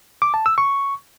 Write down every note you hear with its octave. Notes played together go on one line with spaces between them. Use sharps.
D6
A5
E6
C#6